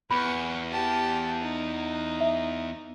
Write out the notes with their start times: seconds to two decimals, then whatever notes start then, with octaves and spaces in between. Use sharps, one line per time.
0.11 E2 B4 B5 C#6
0.71 G4 A5
1.42 D#4
2.20 E5